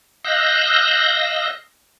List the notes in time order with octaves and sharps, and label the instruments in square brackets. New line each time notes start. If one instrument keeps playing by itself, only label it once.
[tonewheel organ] D#5 F5 E6 F#6 G6 A#6